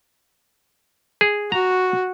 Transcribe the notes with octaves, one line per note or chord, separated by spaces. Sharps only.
G#4
F#4 A#5